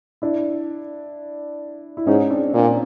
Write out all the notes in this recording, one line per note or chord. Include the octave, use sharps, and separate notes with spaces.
D4 E4
E4
G#2 C#4 D#4
C4 D4
A#2 C4 D4